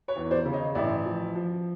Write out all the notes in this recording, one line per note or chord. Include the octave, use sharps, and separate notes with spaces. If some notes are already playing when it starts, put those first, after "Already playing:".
B4 C#5
E2
C5 D5
C#3
C#5 D#5
A1 D5 E5
F3
F3